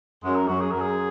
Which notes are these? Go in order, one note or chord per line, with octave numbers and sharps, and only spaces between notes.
F#2 G#3
A#4
F#2 F#4
G#4
F#2 A#4
G#4